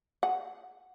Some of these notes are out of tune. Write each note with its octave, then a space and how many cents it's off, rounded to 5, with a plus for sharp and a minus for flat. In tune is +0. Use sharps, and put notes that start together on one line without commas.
G#4 +0 F#5 +0